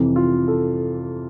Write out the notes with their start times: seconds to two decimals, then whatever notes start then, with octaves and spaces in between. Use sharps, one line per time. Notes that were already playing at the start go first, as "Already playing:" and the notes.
Already playing: F2 C3 E3
0.16 F4
0.48 A4